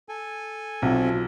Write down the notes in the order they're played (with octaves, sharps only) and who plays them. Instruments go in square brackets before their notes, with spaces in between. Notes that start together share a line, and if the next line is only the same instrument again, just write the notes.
[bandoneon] A4 G#5
[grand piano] B1 [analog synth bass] C3 [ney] F4